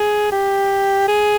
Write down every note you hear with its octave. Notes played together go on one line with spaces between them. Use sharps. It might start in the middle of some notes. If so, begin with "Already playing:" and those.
Already playing: G#4
G4
G#4